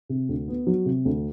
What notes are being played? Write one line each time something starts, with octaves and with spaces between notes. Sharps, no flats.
C3
D2
B3
F#3
C3
D2